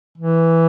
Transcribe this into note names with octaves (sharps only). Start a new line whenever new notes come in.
E3